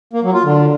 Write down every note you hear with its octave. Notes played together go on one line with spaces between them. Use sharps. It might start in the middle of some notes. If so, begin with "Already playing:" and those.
A#3
F#3
F4
D3